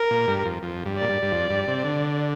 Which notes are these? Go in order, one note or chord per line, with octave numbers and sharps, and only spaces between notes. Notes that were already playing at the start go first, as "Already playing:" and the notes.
Already playing: A#4
A#2
G2
F2
F2
G2
A#2 D5
G2
G2
F2
G2
C3
D3